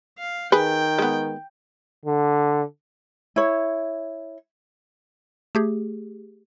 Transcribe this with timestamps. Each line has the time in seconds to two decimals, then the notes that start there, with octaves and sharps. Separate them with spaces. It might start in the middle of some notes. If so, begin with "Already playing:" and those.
0.19 F5
0.52 D#3 G#4 B4 G5
0.98 G#3 B3
2.05 D3
3.36 E4 C#5
5.55 A3 G4 G#4